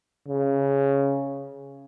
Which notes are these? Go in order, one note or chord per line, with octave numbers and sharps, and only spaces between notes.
C#3